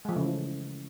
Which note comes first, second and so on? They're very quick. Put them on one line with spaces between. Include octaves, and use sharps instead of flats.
G#3 F3 A3 C#3 E3